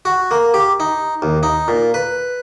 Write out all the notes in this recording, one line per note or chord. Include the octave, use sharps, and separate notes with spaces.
F#4
A#3
G4
D#4
D#2
D#4
A#2
B4